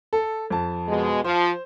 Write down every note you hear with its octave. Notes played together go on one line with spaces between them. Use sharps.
A4
F2 A5
B2 G#3
F3 C5